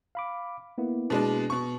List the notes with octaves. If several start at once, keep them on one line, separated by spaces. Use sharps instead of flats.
F5 B5 D6
A#3 B3 E4
B2 G#3 D4
B2 C#6